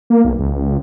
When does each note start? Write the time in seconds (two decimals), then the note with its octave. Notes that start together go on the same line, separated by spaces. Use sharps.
0.10 A#3
0.25 B1
0.39 C#2